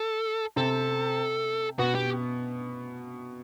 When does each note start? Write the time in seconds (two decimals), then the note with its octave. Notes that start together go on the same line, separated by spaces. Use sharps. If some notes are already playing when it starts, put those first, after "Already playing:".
Already playing: A4
0.56 C3 C4 A4
1.78 B2 B3 F#4
1.95 G4